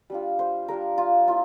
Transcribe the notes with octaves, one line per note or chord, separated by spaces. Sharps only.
G3 D4 F4
C5
G3 D4 F4 A#4
F4
A#3 E4 F4